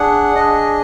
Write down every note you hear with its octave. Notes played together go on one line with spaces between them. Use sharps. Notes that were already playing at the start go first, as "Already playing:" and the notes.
Already playing: D4 G#4 F#5
D4 G#4 D#5